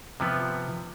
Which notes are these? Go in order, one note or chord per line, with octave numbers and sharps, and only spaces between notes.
C3 F3 B3